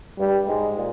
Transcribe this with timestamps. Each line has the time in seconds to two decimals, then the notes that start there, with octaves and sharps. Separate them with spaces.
0.19 G2 G3
0.48 G#2 G#3
0.77 A#2